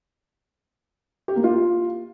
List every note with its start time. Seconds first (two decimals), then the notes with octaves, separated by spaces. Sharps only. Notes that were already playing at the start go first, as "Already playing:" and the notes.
1.28 G4
1.36 A#3
1.44 F4